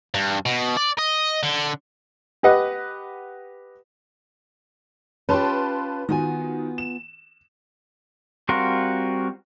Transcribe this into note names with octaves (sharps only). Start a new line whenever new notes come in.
G2
B2
D5
D#5
D3
G4 B4 D#5 F#5
C#4 F4 G4 B4 A5 C6
D#3 B3 F4 F#4 G#5
E7
G3 C4 F4 F#4 A#4